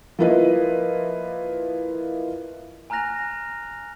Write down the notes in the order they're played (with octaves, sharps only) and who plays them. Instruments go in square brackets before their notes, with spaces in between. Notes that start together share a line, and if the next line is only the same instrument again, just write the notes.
[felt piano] F3 A#3 E4 F4 B4 D#5
[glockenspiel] G#5 A#5 F6 F#6 A#6 F7